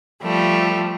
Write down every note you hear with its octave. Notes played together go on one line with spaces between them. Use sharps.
F3 G3 A3